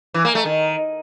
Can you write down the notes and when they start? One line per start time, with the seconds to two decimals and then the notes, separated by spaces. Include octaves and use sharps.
0.14 E3
0.25 A#3
0.35 A3
0.45 D#3